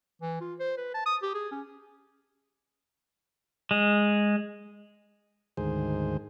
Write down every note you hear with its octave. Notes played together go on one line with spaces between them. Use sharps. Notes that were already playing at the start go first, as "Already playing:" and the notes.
E3
F4
C5
B4
A5
D#6
G4
G#4
C#4
G#3
D2 G#2 D#3 G#4 C5